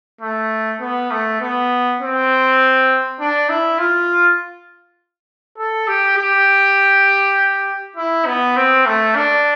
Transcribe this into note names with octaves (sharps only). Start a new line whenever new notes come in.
A3
B3
A3
B3
C4
D4
E4
F4
A4
G4
G4
E4
B3
C4
A3
D4